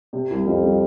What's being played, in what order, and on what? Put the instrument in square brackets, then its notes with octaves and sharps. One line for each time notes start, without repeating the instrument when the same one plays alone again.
[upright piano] C3
C2
[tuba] F2 [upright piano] G3
[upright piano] G3